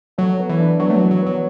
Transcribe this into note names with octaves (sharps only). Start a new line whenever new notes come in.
F#3 A4
B3
E3
D4
F#3 B3
A3
F#3
E3
F#3
F#3 B3